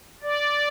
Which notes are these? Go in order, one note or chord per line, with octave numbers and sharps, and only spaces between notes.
D5